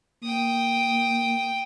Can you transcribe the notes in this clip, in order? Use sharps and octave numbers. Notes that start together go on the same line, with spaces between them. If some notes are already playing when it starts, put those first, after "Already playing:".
A#3 G5 D#6